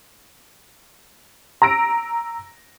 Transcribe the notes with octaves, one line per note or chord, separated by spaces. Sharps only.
A#5 E6 A#6 D7